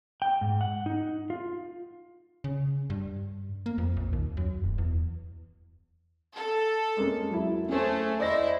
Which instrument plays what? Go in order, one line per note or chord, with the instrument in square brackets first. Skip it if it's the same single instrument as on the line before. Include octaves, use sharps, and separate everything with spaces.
[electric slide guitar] G5
G#2
F#5
D#4
F4
[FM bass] C#3
G2
A#3
F2
A#1
D#2
F#2
D#1
E2
[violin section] A4
[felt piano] G#3 A#3 C#4
F#3 E4
[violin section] A3 G#4 [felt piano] C#4 C5
[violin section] E4 C5 [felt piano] D5 D#5 A#6